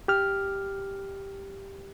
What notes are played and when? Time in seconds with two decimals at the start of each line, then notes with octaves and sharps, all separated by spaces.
0.08 G4 F6